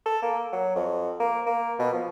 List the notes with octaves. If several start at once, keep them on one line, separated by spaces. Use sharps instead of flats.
A4
A#3
F#3
F2
A#3
A#3
B2
F3